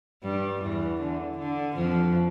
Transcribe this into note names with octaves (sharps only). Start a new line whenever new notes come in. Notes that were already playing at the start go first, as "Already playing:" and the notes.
G2 G3
E2 E3
D3
D3
F2 F3